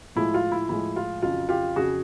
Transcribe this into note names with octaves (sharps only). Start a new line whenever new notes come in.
A2 F3 G#3 E4
F4
E4
A2 F3 G#3 E4
F4
F2 C#3 F#3 F4
F4 G4
F2 C#3 F#3 F#4 G#4